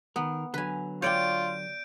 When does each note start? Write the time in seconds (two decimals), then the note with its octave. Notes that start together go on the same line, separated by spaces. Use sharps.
0.16 D#3 B3 A#4
0.54 D3 F#3 B4 G#5
1.02 F4 C#5 D5 G5 G6 D7